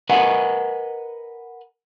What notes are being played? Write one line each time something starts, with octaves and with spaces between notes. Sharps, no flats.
A#4 B4 D#5 F#5 G#5